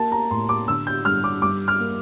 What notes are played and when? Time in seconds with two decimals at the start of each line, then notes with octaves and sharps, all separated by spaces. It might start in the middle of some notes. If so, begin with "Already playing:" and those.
Already playing: A#3 A5
0.12 A#5
0.30 A2 C6
0.49 D6
0.68 D3 E6
0.87 G6
1.05 G2 F6
1.24 D6
1.42 G2 D6
1.68 F6
1.80 A#3